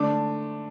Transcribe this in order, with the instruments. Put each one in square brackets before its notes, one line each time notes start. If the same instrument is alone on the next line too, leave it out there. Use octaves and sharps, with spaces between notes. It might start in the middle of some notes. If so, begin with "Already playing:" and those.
Already playing: [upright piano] D3 A3 D4 D6